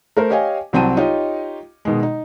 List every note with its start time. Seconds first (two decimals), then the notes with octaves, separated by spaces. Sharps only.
0.17 A3 A#4 C5
0.30 G4 C#5 D#5 F5 G#5
0.73 C2 F#3 C4 G5 A5 D#7
0.97 D#4 F4 G4 C#5 D#5
1.85 B2 D#3 G#3
2.03 D#4